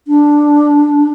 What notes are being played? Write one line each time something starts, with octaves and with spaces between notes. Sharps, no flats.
D4